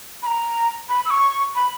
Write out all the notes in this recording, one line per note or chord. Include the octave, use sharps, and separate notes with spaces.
B5
A#5
B5
E6
C#6
B5